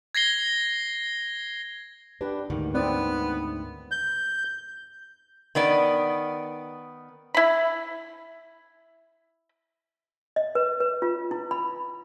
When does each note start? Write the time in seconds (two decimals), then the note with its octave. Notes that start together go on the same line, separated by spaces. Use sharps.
0.15 G#6 A#6 C7 G7
2.21 D4 G4 B4
2.50 D2 G#2 D#3
2.75 B3 C4 E4 D5
3.91 G6
5.55 D#3 B3 D5
7.34 E4 B5
10.36 D#5
10.55 B4
10.80 B4
11.02 F4
11.31 E4
11.51 B5